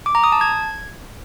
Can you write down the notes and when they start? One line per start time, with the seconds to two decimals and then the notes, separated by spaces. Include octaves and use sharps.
0.06 D6
0.15 A#5
0.24 D#6
0.32 A5
0.41 G#6